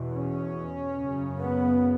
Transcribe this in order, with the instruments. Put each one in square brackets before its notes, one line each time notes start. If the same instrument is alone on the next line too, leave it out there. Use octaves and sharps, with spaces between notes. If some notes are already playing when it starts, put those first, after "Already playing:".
Already playing: [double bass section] E2 B2
C#4
F#2 C#3
B3